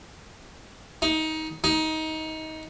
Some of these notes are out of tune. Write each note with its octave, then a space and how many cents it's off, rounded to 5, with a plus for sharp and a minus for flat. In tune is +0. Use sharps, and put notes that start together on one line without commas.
D#4 +20
D#4 +20